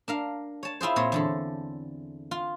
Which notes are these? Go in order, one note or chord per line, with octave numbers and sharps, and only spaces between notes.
D4 A#4 F5
C#5 A5
E4 F4 G#4 C5
A#2 C4 C#5
E2 D3 A4
F4